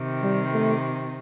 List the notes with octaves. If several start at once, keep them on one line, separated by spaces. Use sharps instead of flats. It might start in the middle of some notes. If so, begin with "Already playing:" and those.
Already playing: C3 D#3
G3
A3